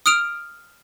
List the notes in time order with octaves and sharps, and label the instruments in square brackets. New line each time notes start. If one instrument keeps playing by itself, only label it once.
[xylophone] D#6 F6 D7 F7